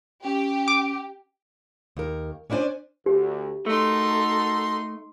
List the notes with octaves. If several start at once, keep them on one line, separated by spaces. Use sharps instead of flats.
C#4 G4
D6
D#2 A#4
C#4 D4 E4 C5 D5 G#5
D2 G4
A3 D#4 F#4 A4 A#4 C6